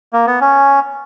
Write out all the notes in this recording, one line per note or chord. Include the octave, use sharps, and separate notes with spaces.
A#3
B3
C#4